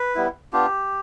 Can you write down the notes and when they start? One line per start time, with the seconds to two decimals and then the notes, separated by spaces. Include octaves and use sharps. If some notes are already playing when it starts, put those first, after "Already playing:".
Already playing: B4
0.15 G3 B3 E4
0.53 B3 D4 F4 G4